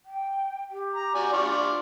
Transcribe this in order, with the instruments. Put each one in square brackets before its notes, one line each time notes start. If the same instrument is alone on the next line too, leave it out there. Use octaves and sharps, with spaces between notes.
[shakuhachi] G5
G4
[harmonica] A#5
F#4 D5 G#5
D4 F4 C#6